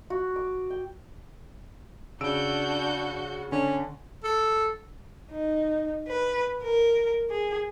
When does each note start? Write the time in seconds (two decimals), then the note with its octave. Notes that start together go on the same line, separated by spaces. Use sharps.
0.10 F#4
0.36 D6
0.70 G5
2.21 C#3 D4 F#4 E6 G6 D7
3.52 D3 C#4
4.24 A4
5.31 D#4
6.07 B4
6.62 A#4
7.29 G#4